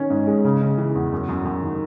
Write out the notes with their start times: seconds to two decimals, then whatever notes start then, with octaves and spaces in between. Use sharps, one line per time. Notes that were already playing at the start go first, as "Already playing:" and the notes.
Already playing: D#3 C#4
0.10 G#2
0.27 G#3
0.45 C#3
0.61 C#3
0.78 E3
0.95 E2
1.12 F#2
1.29 F#2
1.45 F#2
1.62 D#3